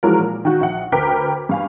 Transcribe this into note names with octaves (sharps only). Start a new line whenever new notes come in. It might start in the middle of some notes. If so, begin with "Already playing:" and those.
E3 F3 G#3 C#4 F#4 A#4
A#2
D#3 F#4
A#1 F#5
D2 A#4 B4 G5 D6 B6
G2 F5 G#5